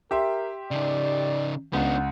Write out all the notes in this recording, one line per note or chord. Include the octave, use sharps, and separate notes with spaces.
G4 A#4 E5 C6
C#3 D#4 D5
C#2 B3 D4 F#5